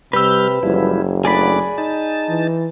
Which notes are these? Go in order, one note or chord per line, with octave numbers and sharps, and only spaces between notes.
C3 G3 B4 E6 F6 G6
F#1 F3 G3 E4
A3 D4 G#4 D5 B5 D6
D#4 A5
E3